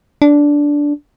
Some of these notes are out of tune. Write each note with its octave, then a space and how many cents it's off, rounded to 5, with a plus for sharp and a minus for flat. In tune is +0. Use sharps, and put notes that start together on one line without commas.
D4 -10